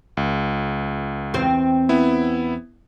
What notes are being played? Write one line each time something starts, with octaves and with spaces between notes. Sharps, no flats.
C#2
E2 C4 C5
B3 E4